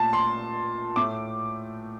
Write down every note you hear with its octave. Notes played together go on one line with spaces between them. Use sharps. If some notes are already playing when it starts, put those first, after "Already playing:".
Already playing: A#2 A3 A5
C6
A2 A3 D6